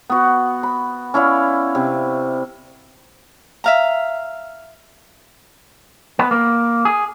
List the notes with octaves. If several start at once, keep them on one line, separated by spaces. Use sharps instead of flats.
B3 F#4
B5
C#4 E4 D5 F5
C3
E5 F5 A#5
B3
A#3
G#4